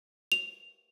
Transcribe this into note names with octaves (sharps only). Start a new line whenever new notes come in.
F7